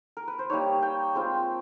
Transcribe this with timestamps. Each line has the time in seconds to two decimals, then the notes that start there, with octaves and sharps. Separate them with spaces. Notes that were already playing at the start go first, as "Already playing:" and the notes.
0.17 A#4
0.28 B4
0.39 C5
0.50 G3 A#3 D#4 C#5
0.82 G5
1.15 G#3 C4 F4